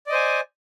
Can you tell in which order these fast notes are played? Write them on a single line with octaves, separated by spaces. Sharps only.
D5 D#5 C5 G#5